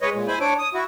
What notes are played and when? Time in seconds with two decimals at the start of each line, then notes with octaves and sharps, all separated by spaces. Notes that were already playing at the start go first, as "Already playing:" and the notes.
0.01 G#3 B4 C#5 D#5
0.13 A#2 G#3
0.28 E4 C5 G#5 B5
0.41 D4 C#5 D6
0.59 D#6
0.74 E4 F#4